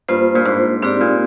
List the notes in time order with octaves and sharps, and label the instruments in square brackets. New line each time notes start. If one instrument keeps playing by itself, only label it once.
[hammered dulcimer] G2 [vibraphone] A#3 F4 C5
[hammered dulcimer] A#2
G#2
[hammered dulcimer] G#2 [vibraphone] C4 D#4 G4 D5
[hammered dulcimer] A#2